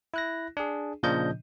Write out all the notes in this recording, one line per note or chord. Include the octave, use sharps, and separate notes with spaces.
E4 F#6 A#6
D4 G#4
A#2 C#3 F3 D4 D#5 G6